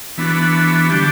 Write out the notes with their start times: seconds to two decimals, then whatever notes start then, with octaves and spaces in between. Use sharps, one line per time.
0.18 E3 B3 D4 F#4
0.89 D3 G3 D4 G4